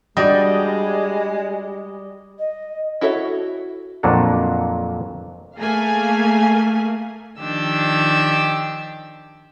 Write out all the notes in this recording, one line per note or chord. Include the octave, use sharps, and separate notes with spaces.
G3 G#3 D4 F#4 D5 D#5
D#5
E4 F#4 A4 C#5 E5
F2 A#2 F#3 A#3 D4 F#5
A3 A#3 G#4 F5 G#5
D#3 F3 D4 G4 E6